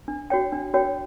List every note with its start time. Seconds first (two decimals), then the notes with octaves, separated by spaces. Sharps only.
0.08 D4
0.30 F#4 C#5 G5
0.52 D4
0.74 F#4 C#5 G5